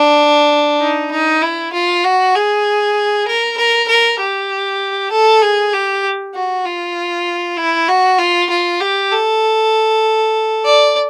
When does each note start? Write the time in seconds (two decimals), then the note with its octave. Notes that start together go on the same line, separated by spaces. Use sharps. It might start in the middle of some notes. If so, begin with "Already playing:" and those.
Already playing: D4
0.81 D#4
1.11 D#4
1.42 E4
1.73 F4
2.04 F#4
2.35 G#4
3.27 A#4
3.57 A#4
3.88 A#4
4.19 G4
5.11 A4
5.42 G#4
5.73 G4
6.34 F#4
6.65 F4
7.57 E4
7.88 F#4
8.18 F4
8.49 F4
8.80 G4
9.11 A4
10.65 D5